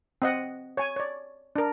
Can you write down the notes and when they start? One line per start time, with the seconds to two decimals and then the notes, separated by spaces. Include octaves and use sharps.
0.22 C4 D#5 F#5
0.77 C#5 G#5
0.96 C#5 D5
1.56 D4 A#4